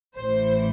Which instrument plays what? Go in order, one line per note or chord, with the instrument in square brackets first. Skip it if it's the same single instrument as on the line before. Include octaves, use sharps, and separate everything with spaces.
[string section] A1 A2 E3 C5